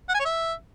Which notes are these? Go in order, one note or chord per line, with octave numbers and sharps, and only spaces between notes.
F#5
G#5
C#5
E5